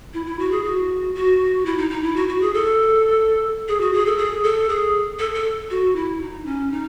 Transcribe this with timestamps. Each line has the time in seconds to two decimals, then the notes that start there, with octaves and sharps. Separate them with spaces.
0.14 E4
0.26 E4
0.39 F#4
0.52 G#4
0.64 F#4
1.15 F#4
1.66 E4
1.78 D#4
1.90 D#4
2.03 E4
2.16 F#4
2.29 F#4
2.41 G#4
2.54 A4
3.68 G#4
3.81 F#4
3.93 G#4
4.06 A4
4.18 G#4
4.43 A4
4.69 G#4
5.19 A4
5.34 A4
5.70 F#4
5.96 E4
6.21 D#4
6.45 C#4
6.71 D#4